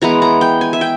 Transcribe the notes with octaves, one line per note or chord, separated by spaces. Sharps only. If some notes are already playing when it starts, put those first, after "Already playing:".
E3 G#3 B3 A#5
A#5
G5
G#5
E5
G5